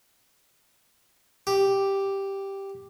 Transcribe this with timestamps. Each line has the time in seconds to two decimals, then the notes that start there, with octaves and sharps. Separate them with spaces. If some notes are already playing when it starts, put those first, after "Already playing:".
1.47 G4